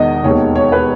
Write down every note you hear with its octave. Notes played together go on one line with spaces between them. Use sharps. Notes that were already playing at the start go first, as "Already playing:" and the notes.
Already playing: E1 E2 D#3 D#5
E1 D#2 D#3 C#5
C#5
B4